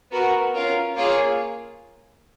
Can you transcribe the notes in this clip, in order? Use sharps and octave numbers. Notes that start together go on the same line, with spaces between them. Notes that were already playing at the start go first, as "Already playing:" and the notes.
B3 F#4 A#4
C#4 F4 A#4
A#3 F4 G#4 C#5